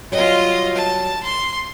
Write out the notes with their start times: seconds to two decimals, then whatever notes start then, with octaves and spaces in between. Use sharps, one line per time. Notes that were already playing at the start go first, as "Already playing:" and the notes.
0.12 F#3 G3 F4 D#5
0.74 A5
1.23 C6